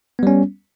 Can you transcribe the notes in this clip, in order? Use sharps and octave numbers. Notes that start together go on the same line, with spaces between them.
G3 B3 C#4